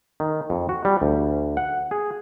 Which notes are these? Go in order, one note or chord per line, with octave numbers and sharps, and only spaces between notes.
D#3
F2
F#4
G3
D2
F#5
G#4